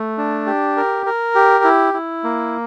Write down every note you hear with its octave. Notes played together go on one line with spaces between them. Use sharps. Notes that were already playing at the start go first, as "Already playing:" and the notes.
Already playing: A3
D4
G4
A#4
A#4
G4
E4
E4
A#3